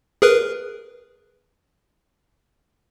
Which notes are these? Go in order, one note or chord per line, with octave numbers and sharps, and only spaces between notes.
G#4 A#4 B4